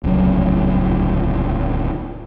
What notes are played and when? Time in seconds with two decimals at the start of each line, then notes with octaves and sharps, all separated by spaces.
0.04 D1 C2 C#3 F#3